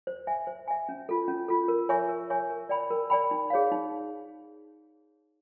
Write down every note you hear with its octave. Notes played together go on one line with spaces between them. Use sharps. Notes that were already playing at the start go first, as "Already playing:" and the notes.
C5
E5 G#5
C5
E5 G#5
C#4
F4 A4
C#4
F4 A4
A#4
C#5 E5 G#5 C#6
A#4
C#5 E5 G#5 C#6
A#4
D5 G5 B5
A#4
D5 G5 B5
D#4
G#4 C#5 F5
D#4